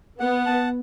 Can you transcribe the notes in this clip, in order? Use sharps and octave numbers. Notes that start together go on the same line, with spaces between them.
B3 F#5
A5